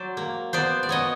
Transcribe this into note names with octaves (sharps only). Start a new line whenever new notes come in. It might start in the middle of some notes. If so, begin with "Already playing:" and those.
Already playing: F#3 C5 D5
A#3
B3 C5 D5
D5
B3 C#5 D#5